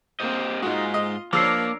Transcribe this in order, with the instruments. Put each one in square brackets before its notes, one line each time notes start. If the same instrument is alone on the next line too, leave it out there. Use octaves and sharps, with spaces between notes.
[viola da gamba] A#3 C4 [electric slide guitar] G4 C5 D#5
[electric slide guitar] G#2 G#3 [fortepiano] D#4 F#4 [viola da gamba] F4
[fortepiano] D#5
[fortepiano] F3 [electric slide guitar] A#3 [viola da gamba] D4 A#4 C#5 [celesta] D6 E6 C7